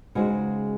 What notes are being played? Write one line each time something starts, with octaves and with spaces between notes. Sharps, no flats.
C#3 G#3 D#4 F#4 C5